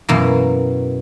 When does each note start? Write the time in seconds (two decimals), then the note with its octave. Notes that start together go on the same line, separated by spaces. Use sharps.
0.09 F#2 B2 E3 A#3